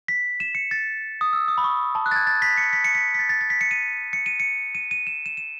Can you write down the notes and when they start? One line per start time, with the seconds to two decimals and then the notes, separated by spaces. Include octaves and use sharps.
0.08 B6
0.40 E7
0.55 C#7
0.71 A6
1.21 D#6
1.33 E6
1.48 D#6
1.58 B5
1.64 C#6
1.95 A5
2.06 F#6
2.11 A6
2.16 G#6
2.27 A6
2.42 B6
2.57 C#7
2.73 B6
2.85 C#7
2.95 B6
3.14 B6
3.19 A6
3.29 A6
3.41 A6
3.50 B6
3.61 C#7
3.71 D#7
4.13 C#7
4.26 D#7
4.40 C#7
4.75 D#7
4.91 D#7
5.07 E7
5.26 E7
5.37 E7